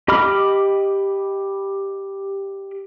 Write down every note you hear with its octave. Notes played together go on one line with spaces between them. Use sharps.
G4 D#5 B5 D6 F6